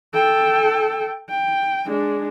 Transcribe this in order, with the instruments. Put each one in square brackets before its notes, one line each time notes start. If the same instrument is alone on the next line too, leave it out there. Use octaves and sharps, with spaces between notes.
[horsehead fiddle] A4 G5
G5
G#3 D4